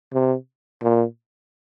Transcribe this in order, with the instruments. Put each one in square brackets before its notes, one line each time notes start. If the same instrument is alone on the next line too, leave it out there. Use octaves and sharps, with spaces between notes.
[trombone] C3
A#2